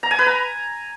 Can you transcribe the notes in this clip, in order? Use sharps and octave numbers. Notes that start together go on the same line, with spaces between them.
A#5
G#5
B4
A#5